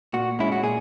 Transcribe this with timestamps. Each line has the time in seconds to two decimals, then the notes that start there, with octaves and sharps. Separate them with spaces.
0.13 A#2 F#4
0.39 G#3 C#4 E4
0.52 F#4
0.63 A#2 G#4